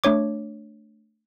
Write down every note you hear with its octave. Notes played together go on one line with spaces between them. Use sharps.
A3 D4 C#5 D6